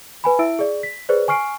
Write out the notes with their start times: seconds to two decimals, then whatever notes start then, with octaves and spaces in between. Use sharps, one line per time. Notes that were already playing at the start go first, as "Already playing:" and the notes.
0.24 B4 G#5 B5
0.39 E4 E5 E6 D7
0.59 G#4 D5
0.83 B6
1.09 G#4 B4 C5 D5
1.28 G#5 C#6 F6 C7 D7